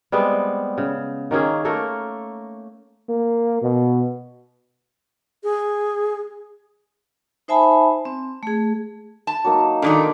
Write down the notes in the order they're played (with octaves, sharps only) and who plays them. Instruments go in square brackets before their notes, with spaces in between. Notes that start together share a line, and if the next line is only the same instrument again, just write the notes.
[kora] G3 G#3 B3 C4
C#3
D#3 A#3 C#4 G#4
A3 A#3 A4 A#4
[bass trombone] A#3
B2
[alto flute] G#4
[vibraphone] D#4 C5 E5 G#5 A5 B5
C4
A3 G#4
[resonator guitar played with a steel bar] A5
[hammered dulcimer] F#3 A#3 D#4
[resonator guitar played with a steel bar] A#2 D#3 D5 [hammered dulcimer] D3 A#3 A#4